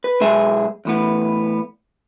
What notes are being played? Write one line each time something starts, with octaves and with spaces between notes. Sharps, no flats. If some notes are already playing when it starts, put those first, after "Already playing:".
B4
B1 G#3 G#4 E5
E2 A2 B3